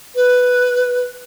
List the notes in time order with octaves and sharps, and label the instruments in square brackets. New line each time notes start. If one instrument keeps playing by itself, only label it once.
[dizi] B4